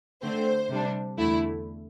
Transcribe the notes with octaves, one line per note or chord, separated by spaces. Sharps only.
D3 A3 C4 C5
C3 G3 D4
E2 D3 A3 E4